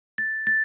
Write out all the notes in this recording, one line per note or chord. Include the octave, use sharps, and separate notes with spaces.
A6
A6